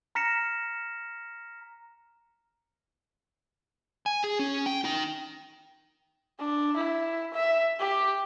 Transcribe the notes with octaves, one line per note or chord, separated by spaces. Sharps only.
A#5 F6 A#6 B6 C#7 E7
G#5
G#4
C#4
G5
D#4 G5
D4
E4
E5
G4